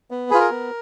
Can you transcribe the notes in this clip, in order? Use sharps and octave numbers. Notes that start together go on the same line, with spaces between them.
B3
F4 G#4 B4
A#4
B3